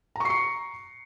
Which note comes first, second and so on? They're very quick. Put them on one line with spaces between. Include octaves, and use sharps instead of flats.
A#5 C#6 C7 C#7